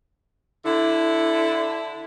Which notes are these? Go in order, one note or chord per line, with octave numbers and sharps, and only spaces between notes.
D3 E4